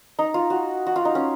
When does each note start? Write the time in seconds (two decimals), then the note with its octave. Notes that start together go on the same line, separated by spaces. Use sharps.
0.19 D#4
0.34 F4
0.50 F#4
0.86 F#4
0.96 F4
1.05 D#4
1.15 C#4